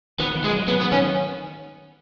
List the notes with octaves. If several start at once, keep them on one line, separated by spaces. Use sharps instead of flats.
D#3 B3
D#3
G#3
F#3
F#3 B3
B3
D#3 C#4